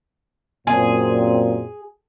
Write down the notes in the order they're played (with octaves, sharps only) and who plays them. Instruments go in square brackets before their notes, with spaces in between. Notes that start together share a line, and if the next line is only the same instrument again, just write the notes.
[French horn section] F#2 A#2 C4 [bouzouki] G#4